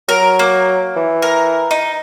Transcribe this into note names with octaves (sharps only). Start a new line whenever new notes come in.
F#3 A#4
A#3
E3
A#4
D#4